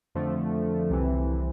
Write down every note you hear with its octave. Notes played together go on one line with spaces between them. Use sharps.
F2 D3 F3 A3
C2 C3 E3